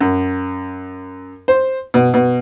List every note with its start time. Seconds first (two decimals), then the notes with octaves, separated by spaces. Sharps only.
0.01 F#2
1.48 C5
1.94 B2
2.14 B2